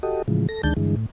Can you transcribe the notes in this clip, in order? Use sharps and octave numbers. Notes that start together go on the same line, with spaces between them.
F#4 G4 A4 D#5
A2 C#3 E3 F3 G#3
A4 A#6
D2 D#3 G#3 D4 A5 G6
G2 D3 E3 G#3
A2